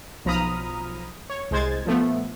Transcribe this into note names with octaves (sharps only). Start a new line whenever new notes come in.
B1 F3 A#5 B5 D#6 F6
C#5
C2 G#3 C5 G#6 A6
A#2 F3 A3 B3